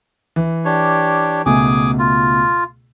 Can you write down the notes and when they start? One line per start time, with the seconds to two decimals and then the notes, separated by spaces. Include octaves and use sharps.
0.36 E3
0.65 D4 G4 C#5
1.46 C#2 B2 A3 G#4 G#5 D6
1.99 F4